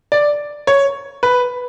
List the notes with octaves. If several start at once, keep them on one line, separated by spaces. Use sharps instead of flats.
D5
C#5
B4